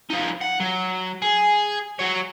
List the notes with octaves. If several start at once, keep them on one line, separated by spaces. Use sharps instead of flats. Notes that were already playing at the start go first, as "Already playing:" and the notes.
F3 D#4
F#5
F#3
G#4
F#3 C#5